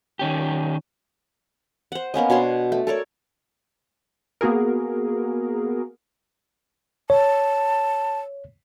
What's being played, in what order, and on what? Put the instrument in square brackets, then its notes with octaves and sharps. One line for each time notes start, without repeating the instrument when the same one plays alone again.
[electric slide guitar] D#3 C#4 G4
[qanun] C5 F#5
A#3 B3 C#4 D#5
B2 D4 C#5 C6
A3
A4 A#4 C#5 D5
[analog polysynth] A#3 B3 F#4 G#4 A#4
[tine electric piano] C#5 [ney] A5